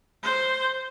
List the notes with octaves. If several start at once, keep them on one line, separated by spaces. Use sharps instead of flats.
C5